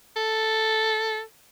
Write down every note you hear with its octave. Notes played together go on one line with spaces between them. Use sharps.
A4